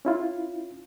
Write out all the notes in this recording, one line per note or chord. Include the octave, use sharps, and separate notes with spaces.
C#4 E4 F4